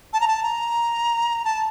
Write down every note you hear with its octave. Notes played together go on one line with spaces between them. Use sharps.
A5
A#5
A5
A#5
A5